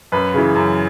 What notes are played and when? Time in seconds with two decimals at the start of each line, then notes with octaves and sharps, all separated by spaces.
0.12 F#2 B4
0.34 C#3 E3
0.55 F#2